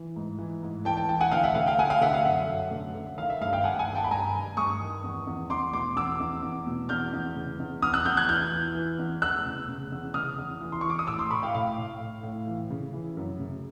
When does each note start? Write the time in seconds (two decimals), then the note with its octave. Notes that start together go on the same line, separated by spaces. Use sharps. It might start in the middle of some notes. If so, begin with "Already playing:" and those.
Already playing: E3
0.16 G#2
0.39 E3
0.63 G#2
0.85 E3 G5 A5
0.97 G5 A5
1.09 E3 G5 A5
1.20 F#5 G#5
1.31 D3 F5 G5
1.44 E5 F#5
1.55 D3 F5
1.66 F5 G5
1.78 D3 F#5 G#5
1.90 F5 G5
2.01 D3 E5 F#5
2.14 F5
2.25 F#2 E5 F#5
2.48 F#2
2.71 D3
2.95 D3
3.18 D#3 F5
3.30 E5
3.41 G2 F5
3.53 F5 G5
3.64 G2 F#5 G#5
3.79 F#5 G#5
3.87 D#3
3.95 G5 A5
4.04 B5
4.11 G2 G#5 A#5
4.35 G2
4.57 G2 C#6 D#6
4.80 D#3
5.04 E2
5.27 E2
5.50 E2 C6 D6
5.73 B2 C6 D6
5.96 E2 D6 E6
6.20 E2
6.42 E2
6.66 B2
6.89 E2 F6 G6
7.13 E2
7.36 C#3
7.60 E2
7.82 E2 D#6 F6
7.94 E6 F#6
8.05 E2 F6 G6
8.17 F#6 G#6
8.29 E3 F6 G6
8.52 E3
8.75 E3
8.99 E2
9.22 E2 E6 F#6
9.45 C#3
9.68 C#3
9.92 E2
10.14 C#3 D#6 F6
10.38 E2
10.61 E3
10.72 C6
10.81 E3 C#6
10.90 D6
10.99 D#6
11.07 A2 D6 E6
11.19 C6 D6
11.30 A2 B5 C#6
11.42 F5 G5
11.54 A2 F5
11.77 A2
12.00 A2
12.23 A2
12.47 E3
12.70 C#3
12.93 E3
13.17 F#2
13.39 C#3